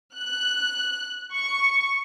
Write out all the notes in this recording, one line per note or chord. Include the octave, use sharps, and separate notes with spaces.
F#6
C#6